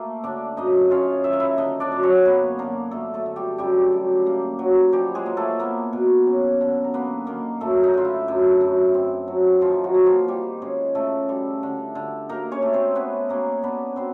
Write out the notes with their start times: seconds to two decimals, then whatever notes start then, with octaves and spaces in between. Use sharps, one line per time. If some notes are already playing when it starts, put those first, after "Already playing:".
Already playing: A3 A#3 A4
0.24 D3 D4 D5
0.57 F#2 D#4 D#5
0.91 C#4 F4 F5
1.24 D#3 E5
1.33 F5
1.40 E4 E5
1.58 D3 D#4 D#5
1.80 D4 D5
1.92 F#2
2.03 C#4 C#5
2.25 A#3 B3 B4
2.59 D3 A#3 A#4
2.91 D3 A3 A4
3.14 A3 A4
3.26 D3
3.36 G3 G4
3.58 F#2 G3 G4
3.92 F#2
4.26 A#3
4.59 F#3
4.92 F3 G3 G4
5.15 G#3 G#4
5.26 A#3
5.37 A3 A4
5.59 A#3 B3 A#4
5.93 B2
6.27 C#4
6.61 D3
6.84 A#4
6.94 A#3 B3 B4
7.27 D#3 A#3 A#4
7.61 F#2 A3 A4
7.84 D#4
7.94 D3 F4
8.05 E4
8.28 F#2
8.61 F#2
8.94 C4
9.28 F#3
9.61 D#3 F3 F4
9.84 F#3 F#4
9.94 A#3
10.06 F3 F4
10.28 D#3 G3 G4
10.62 G#3 C#4 G#4
10.95 C#3 A3 A4
11.29 G3
11.63 D3
11.95 D3
12.29 A#3 D#4 A#4
12.51 C#4 C#5
12.62 A3
12.73 C4 C5
12.95 B3 C#4 B4
13.29 A#3 C#4 A#4
13.63 B3 D4 B4
13.96 B3 C4 C5